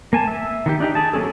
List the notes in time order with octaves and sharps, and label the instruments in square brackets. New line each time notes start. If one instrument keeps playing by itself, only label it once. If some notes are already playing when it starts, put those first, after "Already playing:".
[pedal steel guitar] A#3 G#5 A5
E5
D#3 D#4 G4
D4 D#4 G4
G#4 A5
F#3 A#3 C#4 G#4 A4